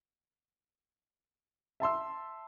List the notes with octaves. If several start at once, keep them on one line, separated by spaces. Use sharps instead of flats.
E5 A5 C6 E6